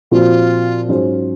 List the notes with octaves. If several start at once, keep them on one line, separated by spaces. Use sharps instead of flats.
A#2 F3 C4 F4 F#4
G#2 F#3 C#4 F4 C5